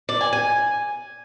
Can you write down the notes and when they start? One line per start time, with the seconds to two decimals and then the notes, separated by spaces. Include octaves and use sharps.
0.09 D5
0.21 G#5
0.33 G#5